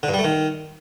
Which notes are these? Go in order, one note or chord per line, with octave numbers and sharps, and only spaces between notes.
D3
G2
G3
A3
D#3